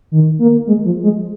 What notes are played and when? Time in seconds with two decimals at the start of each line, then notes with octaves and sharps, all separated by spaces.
0.12 D#3
0.39 A#3
0.67 G#3
0.85 F3
1.03 G#3